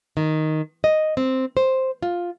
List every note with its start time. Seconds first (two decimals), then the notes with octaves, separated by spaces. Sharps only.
0.17 D#3
0.84 D#5
1.17 C4
1.57 C5
2.03 F4